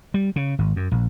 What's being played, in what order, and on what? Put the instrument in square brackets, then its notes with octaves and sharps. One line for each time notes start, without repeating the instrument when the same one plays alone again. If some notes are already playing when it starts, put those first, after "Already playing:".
[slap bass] G3
C#3
G#1
F#2
A#1